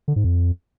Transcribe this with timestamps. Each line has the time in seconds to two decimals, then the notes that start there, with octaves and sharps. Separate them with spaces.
0.08 D3
0.16 G#2
0.24 F2